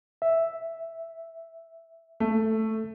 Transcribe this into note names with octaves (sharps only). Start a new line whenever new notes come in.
E5
A3